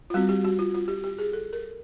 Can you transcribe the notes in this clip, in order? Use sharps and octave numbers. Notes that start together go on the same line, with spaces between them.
F4
G3 C4 F#4
G4
F#4
F4
F4
G4
G4
G#4
A4
A#4